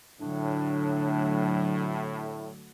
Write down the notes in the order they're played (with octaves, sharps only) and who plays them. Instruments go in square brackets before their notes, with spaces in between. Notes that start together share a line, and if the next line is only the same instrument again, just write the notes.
[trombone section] A2 [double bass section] D3 F#3 A3 [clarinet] D4